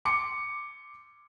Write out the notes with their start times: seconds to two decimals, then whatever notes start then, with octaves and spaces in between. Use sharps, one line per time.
0.05 C6 D6 C#7